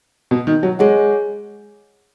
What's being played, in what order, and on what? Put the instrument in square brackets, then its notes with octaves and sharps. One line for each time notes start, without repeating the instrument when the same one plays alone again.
[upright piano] B2
D#3
F#3
[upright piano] G#3 [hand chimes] G#4 C#5 F#5